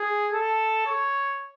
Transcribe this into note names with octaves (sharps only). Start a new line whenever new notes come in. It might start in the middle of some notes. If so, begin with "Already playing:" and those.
Already playing: G#4
A4
C#5